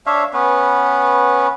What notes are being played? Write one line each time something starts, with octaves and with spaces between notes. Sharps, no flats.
D4 C#5 E5 F5
B3 C#4 B4